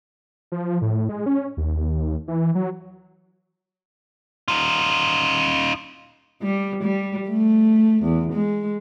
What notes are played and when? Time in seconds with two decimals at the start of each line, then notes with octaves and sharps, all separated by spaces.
0.52 F3
0.82 A2
1.09 G#3
1.26 C#4
1.57 D#2
2.28 E3
2.55 F#3
4.48 D#4 F4
6.42 G3
6.83 G3
7.29 A3
8.03 E2
8.33 G#3